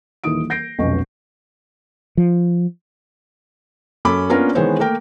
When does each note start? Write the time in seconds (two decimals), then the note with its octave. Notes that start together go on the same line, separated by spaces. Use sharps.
0.24 D#1 D#3 E3 E4 D#6 D7
0.50 G6 A#6 C7 D7
0.79 F1 B1 B2 C#4 C#6
2.17 F3
4.05 F#2 C#4 A4 B5 D6
4.29 A#3 B3 C#4 D4 F4 A#4
4.55 D#3 E3 G#3 B3 C5 C#5
4.79 A3 A#3 A#4 G5